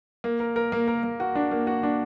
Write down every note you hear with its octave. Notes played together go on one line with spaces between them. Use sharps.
A#3
A#4
A#4
A#3
A#4
A#3
F#4
D4
A#3
F#4
D4